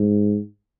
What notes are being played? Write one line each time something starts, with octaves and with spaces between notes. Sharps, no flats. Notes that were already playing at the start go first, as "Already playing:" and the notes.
Already playing: G#2